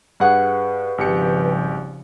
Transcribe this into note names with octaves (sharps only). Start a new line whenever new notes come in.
G2 G#4 B4 F#5
G#1 C#3 F3 G3 G4 C#7